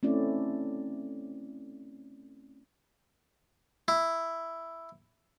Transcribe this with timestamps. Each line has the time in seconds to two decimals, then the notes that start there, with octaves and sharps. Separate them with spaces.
0.03 A3 C4 C#4 E4 D5
3.88 E4